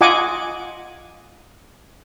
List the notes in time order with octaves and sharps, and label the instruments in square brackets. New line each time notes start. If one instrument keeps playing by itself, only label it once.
[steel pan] F4 D#5 F#5 G#5 D6